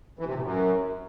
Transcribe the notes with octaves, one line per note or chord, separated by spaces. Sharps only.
E3
C3
A2
F#2